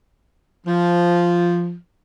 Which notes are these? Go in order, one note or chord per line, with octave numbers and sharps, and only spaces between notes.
F3